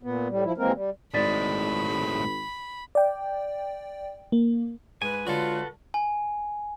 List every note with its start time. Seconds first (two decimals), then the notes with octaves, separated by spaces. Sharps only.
0.03 A#2 B3
0.29 A2 G3
0.44 F3 E4
0.58 D#2 E3 G#3 A#3 C4 A#4
0.75 G3
1.14 G#1 A2 G#3 D5 B5 A6 B6
2.95 D5 G5
4.32 A#3
5.02 G#2 B4 G#5
5.27 D3 F#3 G#3 F4 F#4 A4
5.94 G#5